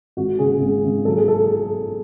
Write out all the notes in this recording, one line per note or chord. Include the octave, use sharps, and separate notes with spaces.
G#1 F#4
C#3 G#4
G#1
G#1
F#3 A4
G#4
A4